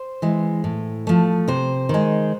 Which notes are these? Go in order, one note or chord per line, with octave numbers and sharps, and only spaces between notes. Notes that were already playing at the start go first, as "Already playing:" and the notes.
Already playing: C5
E3 G#3
A2
F3 A3
C3 C5
D#3 G#3